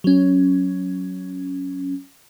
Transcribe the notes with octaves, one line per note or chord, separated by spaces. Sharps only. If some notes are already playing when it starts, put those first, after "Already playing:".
F#3 C#4